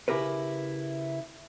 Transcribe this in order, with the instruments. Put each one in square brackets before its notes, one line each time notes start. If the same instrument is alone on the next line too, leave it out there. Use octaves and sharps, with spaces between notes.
[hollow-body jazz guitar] C#3 E4 G4 A#4 B4